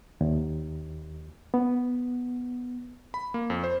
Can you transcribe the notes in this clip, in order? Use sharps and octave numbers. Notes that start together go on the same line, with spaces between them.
D#2
B3
B5
A#3
F2
C5